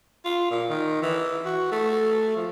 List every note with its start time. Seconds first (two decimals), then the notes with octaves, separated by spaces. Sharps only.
0.25 F4
0.51 A#2
0.69 D#3
1.02 E3
1.45 F#4
1.71 A3
2.36 F3